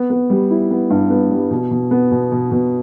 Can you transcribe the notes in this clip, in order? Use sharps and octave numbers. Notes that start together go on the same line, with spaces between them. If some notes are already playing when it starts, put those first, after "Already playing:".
Already playing: B3
B3
G3
E4
B3
G2
B3
G3
B2
B2
B3
B2
B2
B2